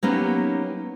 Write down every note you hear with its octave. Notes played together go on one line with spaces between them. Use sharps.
F#3 A#3 B3 C#4 D#4 G4